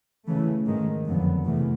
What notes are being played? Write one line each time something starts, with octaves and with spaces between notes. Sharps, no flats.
C#3 E3 A3
G#2 D#3 G#3
F2 D3 F#3 B3
E2 C3 E3 A3